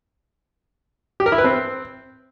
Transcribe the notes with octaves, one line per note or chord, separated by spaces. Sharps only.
G4
A#4
E4
B4
C4